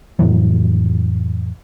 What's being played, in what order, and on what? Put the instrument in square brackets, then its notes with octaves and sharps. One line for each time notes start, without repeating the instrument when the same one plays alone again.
[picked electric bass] F2 A2 E3 F#3